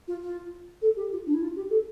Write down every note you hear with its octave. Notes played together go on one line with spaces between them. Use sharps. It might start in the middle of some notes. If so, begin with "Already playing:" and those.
F4
F4
A4
G4
F4
D4
E4
F4
G4
A4